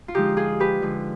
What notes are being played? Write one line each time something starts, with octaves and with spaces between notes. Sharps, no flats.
F4
D3 F3 G#3 D#4 G4
F4 G#4
G4 B4
D3 F3 G#3